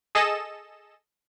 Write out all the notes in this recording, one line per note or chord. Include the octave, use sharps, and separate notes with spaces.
G#4 A4 D#5 E7